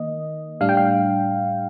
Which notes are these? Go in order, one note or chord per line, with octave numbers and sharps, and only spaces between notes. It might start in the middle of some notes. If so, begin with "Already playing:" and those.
Already playing: D#3 A#3 D#5
A2 G3 D4 F5
G5
F5